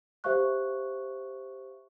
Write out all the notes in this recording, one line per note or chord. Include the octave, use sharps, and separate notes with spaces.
G4 C5 E5 F5 C#6 F#6